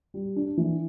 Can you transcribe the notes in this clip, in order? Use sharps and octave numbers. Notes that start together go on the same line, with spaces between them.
G3
D4
E3